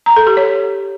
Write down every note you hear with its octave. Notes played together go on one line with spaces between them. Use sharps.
A#5
A4
G4
C#5